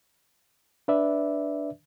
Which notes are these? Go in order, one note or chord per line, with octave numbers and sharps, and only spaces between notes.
D4 B4 D5 E5